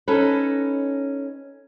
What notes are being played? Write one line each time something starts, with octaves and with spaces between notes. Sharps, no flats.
C#4 D#4 A4 B4